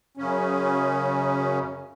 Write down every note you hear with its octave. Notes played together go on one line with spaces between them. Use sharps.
F#2 C#3 C#4